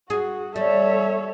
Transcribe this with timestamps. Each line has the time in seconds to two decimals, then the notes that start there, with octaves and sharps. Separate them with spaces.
0.10 F#4 G#4
0.56 G3 A4 C#5 E5